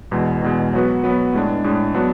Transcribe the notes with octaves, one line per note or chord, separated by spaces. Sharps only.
E2 B2 G#3
E2 B2 G#3
F#3 B3 F#4 B4
F#3 B3 F#4 B4
A2 G#3 D4
A2 G#3 D4
F#3 B3 D4 F#4